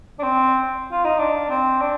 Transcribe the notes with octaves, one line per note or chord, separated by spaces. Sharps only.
D4
C4
F4
D#4
D4
C4
D4